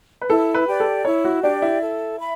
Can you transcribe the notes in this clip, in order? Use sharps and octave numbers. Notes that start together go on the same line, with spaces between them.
B4
E4 A4
B4
G4 D5
A4
E4 C#5
F#4
D4 G4 D5
E4
A4
E5 B5